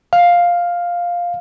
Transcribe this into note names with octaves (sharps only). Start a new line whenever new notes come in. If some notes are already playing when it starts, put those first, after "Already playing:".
F5